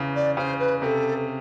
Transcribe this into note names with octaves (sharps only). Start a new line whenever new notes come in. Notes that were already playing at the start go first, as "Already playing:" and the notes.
Already playing: E2 C#3 E3
D5
C#3 C5
B4
C3 A4 A#4